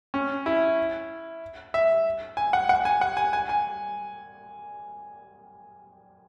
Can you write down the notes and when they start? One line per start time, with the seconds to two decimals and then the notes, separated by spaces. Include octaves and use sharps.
0.14 C#4
0.46 E4
1.74 E5
2.37 G#5
2.53 F#5
2.69 F#5
2.85 G#5
3.01 F#5
3.17 G#5
3.33 G#5
3.49 G#5